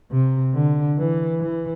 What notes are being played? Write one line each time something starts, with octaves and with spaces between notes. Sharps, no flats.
C3
D3
E3
E3